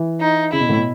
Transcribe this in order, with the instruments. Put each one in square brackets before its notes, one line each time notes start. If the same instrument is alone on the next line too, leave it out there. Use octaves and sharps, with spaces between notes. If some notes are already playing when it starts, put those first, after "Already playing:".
Already playing: [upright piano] E3
[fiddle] D#4
[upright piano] C#3 [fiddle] E4
[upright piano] B2
A2
B2